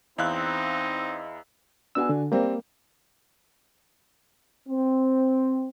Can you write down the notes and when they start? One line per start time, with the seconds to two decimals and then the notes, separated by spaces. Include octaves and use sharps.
0.18 E2 C4 D#4 E4 D#5 F5 E6 F#6
1.95 B3 D4 F#4 G#5 E6
2.09 D3
2.32 G3 A#3 C4
4.69 C4